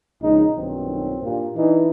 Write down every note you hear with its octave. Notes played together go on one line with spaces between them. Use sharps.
A#1 C#3 G#3 D#4
B1 G2 A#2 D#3 F#3 C4
G2 A#2
E3 D4 D#4